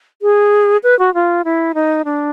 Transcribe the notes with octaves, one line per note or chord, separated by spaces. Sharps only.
G#4
B4
F#4
F4
E4
D#4
D4